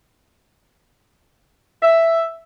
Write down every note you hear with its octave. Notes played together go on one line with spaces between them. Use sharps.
E5